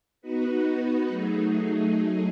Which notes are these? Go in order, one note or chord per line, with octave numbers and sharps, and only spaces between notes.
B3 D#4 F#4 B4
F#3 A3 D#4 G#4